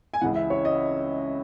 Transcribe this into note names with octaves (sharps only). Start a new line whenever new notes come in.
G#5
C#2 C#3 E3 F#5
E5
C#5
D#5